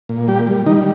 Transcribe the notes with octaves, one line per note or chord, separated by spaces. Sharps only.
A#2
G3 G4
G3
D#3 G3 D#4